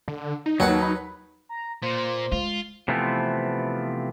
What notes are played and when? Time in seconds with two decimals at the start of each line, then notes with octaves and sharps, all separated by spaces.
0.08 D3
0.46 D#4
0.60 D#2 F#3 B4 C#5 F#5
0.82 B5
1.49 A#5
1.82 A#2 C5
2.32 G#3 F4
2.88 C3 E3 F3 A3 B3 C4